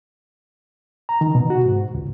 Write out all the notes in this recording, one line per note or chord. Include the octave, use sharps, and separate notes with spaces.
A#5
D#3
B2
F#4
G#2
C#2